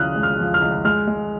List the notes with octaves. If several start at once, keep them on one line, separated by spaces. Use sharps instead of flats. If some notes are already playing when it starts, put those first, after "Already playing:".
Already playing: C#2 C#3 F3 G#3 D#6 F6 F#6
G#3
F6
F3
F6
C#2
G#3 F6
G#3